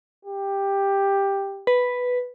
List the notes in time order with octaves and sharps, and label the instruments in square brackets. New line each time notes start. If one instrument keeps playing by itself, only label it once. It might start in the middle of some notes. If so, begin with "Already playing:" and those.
[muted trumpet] G4
[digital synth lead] B4